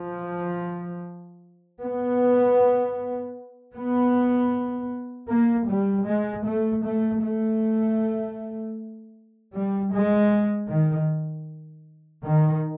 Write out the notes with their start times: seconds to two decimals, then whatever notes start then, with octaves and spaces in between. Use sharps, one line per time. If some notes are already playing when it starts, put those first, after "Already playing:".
Already playing: F3
1.80 B3
3.74 B3
5.28 A#3
5.67 G3
6.06 G#3
6.45 A3
6.84 A3
7.22 A3
9.54 G3
9.93 G#3
10.70 D#3
12.25 D#3